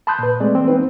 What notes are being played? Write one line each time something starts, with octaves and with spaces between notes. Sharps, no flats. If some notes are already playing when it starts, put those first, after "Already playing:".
A5 B5 C6 D#6 F#6 G6
A#2 B4
G#3 A3 C4 D5
E3 A#3 C4
B3 C4 D#4 B4